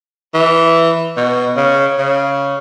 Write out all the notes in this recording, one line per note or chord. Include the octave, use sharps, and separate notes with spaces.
E3
B2
C#3
C#3